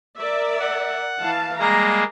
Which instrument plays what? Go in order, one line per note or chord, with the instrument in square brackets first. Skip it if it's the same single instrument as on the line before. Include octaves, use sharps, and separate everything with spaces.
[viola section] A#4 D5 E5
[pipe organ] F#5
[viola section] E3 F5 A5
[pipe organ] G3 G#3 A#3 [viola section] A#5